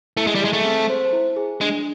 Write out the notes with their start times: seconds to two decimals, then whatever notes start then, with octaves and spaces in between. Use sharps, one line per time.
0.17 A3 E4
0.27 G#3
0.35 G3
0.41 G#3 G#4
0.53 A3
0.65 C4
0.90 C5
1.13 E4
1.37 G#4
1.61 G#3 D4